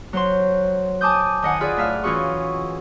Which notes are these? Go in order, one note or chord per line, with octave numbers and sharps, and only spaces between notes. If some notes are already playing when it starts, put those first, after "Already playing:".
F#3 C5 C6
G#5 A5 D6 D#6 G6
D#3 D#5 F#5 G#5
F4 G#4 B4 D5 D#5
A2 E5 F5
E3 C#4 F4 F#4 G#4 C#6